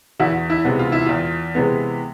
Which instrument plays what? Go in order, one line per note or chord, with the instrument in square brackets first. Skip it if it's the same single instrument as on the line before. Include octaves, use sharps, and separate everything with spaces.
[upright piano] E2 E4 F#4
E4
C3 E3 G#3 B3
F4
E4
E2 F4
C3 E3 G#3 B3